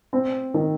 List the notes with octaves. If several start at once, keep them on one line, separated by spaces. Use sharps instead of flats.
C4
D#3